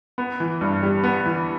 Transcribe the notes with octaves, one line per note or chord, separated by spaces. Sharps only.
B3
E3
G2
G3
B3
E3